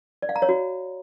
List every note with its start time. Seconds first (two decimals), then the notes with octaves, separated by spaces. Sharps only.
0.22 D5
0.29 F5
0.36 A#5
0.42 C#5
0.49 F#4